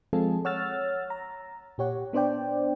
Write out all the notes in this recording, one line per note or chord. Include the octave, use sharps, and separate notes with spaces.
F3 G#3 C4 F4 G#4 A4
C#5 F#5 E6 F6 A6
A#5
A#2 G4 C#5 F#5
B3 D4 C5 D5 G5